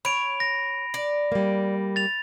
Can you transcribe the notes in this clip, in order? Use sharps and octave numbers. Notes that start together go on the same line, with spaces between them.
C#5 B5 D7 F7
A#6
D5
G3 A#3
A6 F7